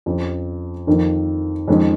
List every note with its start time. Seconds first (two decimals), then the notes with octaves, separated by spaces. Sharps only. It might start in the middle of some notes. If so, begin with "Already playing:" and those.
0.06 F2 F3 C#4
0.87 F2 D#3 A#3
1.68 F2 D#3 G#3 C#4